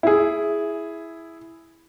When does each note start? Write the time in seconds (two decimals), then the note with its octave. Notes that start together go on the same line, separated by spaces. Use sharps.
0.03 E4 G#4